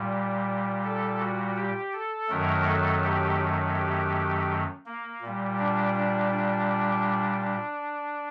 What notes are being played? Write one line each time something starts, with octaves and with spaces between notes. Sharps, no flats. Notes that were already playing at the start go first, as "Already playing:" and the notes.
Already playing: A#2 G3
A4
F#4
G4
A4
F#2 D#3 F#3 A3 A#4
A4
G4
G4
A#3
A#2 G3
D4
D4
D4
D4